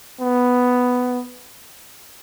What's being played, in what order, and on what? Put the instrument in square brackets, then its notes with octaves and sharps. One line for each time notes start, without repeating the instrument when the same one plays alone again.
[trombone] B3